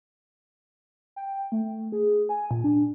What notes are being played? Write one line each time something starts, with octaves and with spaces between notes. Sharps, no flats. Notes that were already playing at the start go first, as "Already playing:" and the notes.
G5
A3
G#4
G#5
A#2
D4